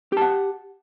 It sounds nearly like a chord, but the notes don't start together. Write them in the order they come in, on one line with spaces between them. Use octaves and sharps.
G4 A5 F#5